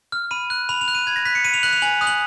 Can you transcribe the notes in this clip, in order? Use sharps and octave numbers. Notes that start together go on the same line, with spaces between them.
F6
B5 D#7
F#6
B5 F7
F7
F#6
D#7
B5 G#6
A#6
F#6 B6
C#7
B5 D#7
F7
F#6 F#7
F7
G#5 F#7
D#6 F#6
F#7